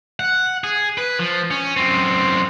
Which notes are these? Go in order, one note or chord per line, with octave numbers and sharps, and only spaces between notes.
F#5
G#4
B4
F3
C#4
F#2 C4